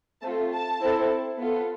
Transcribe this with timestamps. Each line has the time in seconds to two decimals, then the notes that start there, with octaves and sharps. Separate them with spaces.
0.22 A3 C4 F4 A4 A5
0.51 A5
0.80 C4 E4 A4
1.38 B3 F4 A4